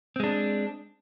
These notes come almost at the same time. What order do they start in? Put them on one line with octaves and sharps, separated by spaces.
C4 G#3 D4